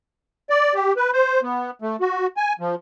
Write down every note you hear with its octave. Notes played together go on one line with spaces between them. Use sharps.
D5
G4
B4
C5
B3
A3
F#4
G#5
F3